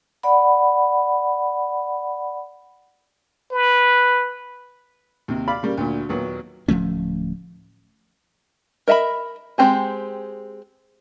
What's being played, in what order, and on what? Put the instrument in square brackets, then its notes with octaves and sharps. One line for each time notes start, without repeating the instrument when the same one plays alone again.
[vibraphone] D5 F#5 B5
[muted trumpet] B4
[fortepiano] D#2 C3
D5 F5 B5
C#3 G3 A#3
D2 A#2
D#2 A#2 F#3 B3
[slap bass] D1 F3 A3 C#4
[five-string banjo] A#4 D#5 E5 F#5 B5
G#3 A3 C4 G4 G#4